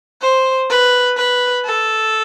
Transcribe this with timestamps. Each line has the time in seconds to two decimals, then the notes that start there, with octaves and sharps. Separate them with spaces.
0.20 C5
0.69 B4
1.16 B4
1.64 A4